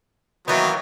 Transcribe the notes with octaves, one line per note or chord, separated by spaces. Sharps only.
D#3 E3 F#3 A#3 B3